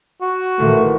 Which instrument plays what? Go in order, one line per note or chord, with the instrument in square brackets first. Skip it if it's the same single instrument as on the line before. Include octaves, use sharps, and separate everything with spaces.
[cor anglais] F#4
[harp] A1 A#2 D#3 [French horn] A3